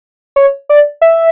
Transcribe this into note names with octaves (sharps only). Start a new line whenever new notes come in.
C#5
D5
E5